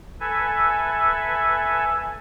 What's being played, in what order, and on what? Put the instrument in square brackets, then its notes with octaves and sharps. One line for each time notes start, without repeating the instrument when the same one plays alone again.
[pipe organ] A4 B4 E5 G#5